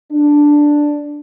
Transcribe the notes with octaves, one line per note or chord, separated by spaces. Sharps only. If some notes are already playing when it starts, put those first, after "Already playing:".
D4